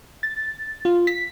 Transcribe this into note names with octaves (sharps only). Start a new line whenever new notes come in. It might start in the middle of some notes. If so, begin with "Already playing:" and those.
A6
F4
B6